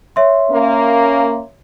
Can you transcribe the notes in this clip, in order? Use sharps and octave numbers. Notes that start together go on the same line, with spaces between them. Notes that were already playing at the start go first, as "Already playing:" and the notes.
C#5 E5 C6
A#3 C#4